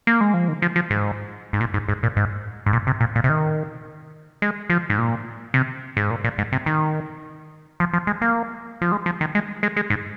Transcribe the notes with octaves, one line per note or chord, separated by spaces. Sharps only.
A#3
G#3
F3
D#3
F3
F3
G#2
G#2
A#2
G#2
G#2
A#2
G#2
G#2
A#2
C3
A#2
A#2
C3
D#3
G#3
F3
G#2
A#2
C3
G#2
A#2
A#2
G#2
C3
D#3
F3
F3
G#3
A#3
F3
G#3
F3
D#3
G#3
G#3
G#3
G#2